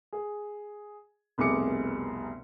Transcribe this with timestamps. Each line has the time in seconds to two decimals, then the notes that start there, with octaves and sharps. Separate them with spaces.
0.13 G#4
1.38 F1 C2 B2 G#4 D6 C#7